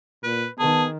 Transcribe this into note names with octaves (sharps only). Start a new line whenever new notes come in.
A#2 B4
D#3 B3 G#4 A5